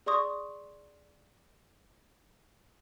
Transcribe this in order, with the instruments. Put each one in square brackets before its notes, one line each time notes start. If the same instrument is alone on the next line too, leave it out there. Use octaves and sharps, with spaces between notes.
[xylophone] G#4 D5 C6 C#6 D#6